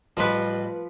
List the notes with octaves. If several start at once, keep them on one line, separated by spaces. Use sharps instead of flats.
A1 F3 G3 B4 D#5